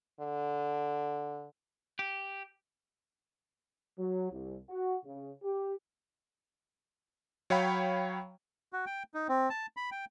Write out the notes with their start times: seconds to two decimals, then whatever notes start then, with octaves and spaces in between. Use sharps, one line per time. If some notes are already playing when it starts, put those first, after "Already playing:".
0.20 D3
1.99 G4
3.97 F#3
4.31 C2
4.68 F#4
5.05 C#3
5.42 G4
7.50 F#3 C#5 F5 G5 B5
8.73 F#4
8.86 G5
9.14 D#4
9.29 C4
9.50 A5
9.77 B5
9.91 G5